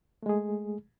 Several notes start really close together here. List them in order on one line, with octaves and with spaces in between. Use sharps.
A3 G#3 G#4